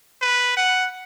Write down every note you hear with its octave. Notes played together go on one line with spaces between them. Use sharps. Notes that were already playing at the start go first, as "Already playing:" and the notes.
B4
F#5